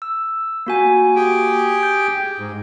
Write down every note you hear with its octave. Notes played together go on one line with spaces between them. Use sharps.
E6
A#3 F#4 G#5
G4 G#4 G5
G6
G#2